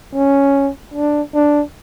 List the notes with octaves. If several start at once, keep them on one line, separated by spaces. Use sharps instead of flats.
C#4
D4
D4